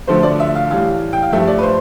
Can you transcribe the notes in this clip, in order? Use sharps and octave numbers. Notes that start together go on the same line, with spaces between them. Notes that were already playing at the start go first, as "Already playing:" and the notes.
D2 D3 F3 A3 C5
D5
E5
F5
A2 E3 G3 F5
G5
F5
G2 F3 A3 E5
D5
B4
C5